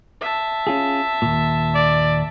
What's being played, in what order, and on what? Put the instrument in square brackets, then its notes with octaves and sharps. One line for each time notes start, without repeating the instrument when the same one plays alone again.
[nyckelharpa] E5 A5
[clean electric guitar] C#4 F4 G#4
D#2 A#2
[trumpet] D5